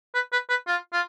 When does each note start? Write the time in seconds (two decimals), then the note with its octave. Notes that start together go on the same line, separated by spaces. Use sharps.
0.15 B4
0.32 B4
0.49 B4
0.68 F4
0.93 F4